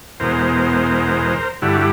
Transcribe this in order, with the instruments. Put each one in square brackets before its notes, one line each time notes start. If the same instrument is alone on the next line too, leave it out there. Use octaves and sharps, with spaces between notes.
[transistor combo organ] E2 B2 G#3 A#4 C5
G2 D3 G3 E4 F#4